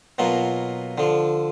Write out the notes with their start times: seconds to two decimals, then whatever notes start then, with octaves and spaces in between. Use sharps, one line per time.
0.18 B2 F#3 A#3 F4
0.98 D3 F3